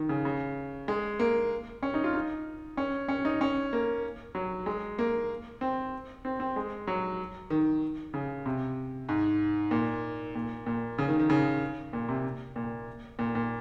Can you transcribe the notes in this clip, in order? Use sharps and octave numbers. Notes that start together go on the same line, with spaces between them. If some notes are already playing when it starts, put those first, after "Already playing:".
Already playing: D#3
C#3
C#3
G#3
A#3
C#4
D#4
F4
D#4
C#4
C#4
D#4
C#4
A#3
F#3
G#3
A#3
C4
C4
C4
G#3
F#3
D#3
C#3
C3
G#2
A#2
A#2
A#2
C#3
D#3
D#3
C#3
A#2
C3
A#2
A#2
A#2